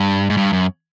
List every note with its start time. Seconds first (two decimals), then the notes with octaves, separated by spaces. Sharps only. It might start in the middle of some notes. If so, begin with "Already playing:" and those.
Already playing: G2
0.30 G#2
0.37 G2
0.53 F#2